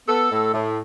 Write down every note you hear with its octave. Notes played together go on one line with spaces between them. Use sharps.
B3 A4
A2
A2